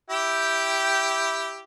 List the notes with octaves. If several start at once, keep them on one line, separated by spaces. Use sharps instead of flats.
E4 G4 G5